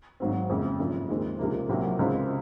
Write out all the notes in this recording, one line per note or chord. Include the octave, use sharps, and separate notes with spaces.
G#1 G#2 F#3 C4
F#1 F2 C#3 G#3
G#1 F#2 F3
D#2 D#3 G#3 C4
C#2 C3 F3 A#3
C2 C3 F#3 A#3
C#2 C#3 G#3 C4 F4